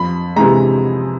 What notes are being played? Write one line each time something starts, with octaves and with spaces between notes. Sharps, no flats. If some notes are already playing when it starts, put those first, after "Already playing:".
Already playing: F2 B5
C3 E3 G#3 A#5